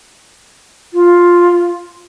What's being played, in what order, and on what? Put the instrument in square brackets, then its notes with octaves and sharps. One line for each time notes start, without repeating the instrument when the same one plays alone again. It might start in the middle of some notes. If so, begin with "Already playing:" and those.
[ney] F4